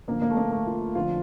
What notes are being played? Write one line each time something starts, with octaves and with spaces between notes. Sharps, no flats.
G2 D3 F3 A#3
A#3
A3
A#3
A3
F4
F2 D3 F3 F4